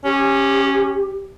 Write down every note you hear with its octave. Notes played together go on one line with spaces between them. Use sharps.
C#4 G4